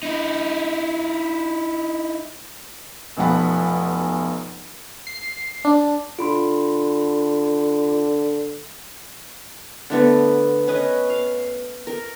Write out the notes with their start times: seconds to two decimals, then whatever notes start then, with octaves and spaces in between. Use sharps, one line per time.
0.03 D#4 E4
3.17 F1 B1 F3 F#5 B5
5.07 C7
5.65 D4
6.19 D3 F4 B5 C6
9.90 D3 A3 B3
10.68 C#4 B4 D#5
11.10 F5
11.87 A#4